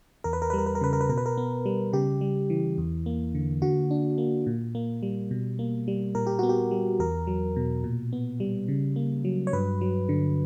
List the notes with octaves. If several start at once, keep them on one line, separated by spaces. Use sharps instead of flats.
E2 A#4
B4
A#4
G3 B4
A#4
B4
A#4
C#3 B4
A#4
B4
B2 A#4
B4
A#4
B3
G3
C#3 G4
G3
E3
E2
A#3
D3
D3 F#4
D4
A#3
A#2
A#3
G3
B2
A#3
G3
A#2 A#4
G4
B3 F#4
G4
G3
E2 A#4
F#3
B2
A#2
B3
G3
C#3
A#3
F#3
C#5
G2 B4
F#3
D3